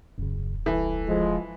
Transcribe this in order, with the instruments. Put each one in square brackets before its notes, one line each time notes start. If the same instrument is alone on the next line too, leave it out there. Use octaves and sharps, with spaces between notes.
[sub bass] D#1 [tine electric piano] F#2 C#3
[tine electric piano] C2 A4 [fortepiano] E3
[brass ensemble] F3 G#3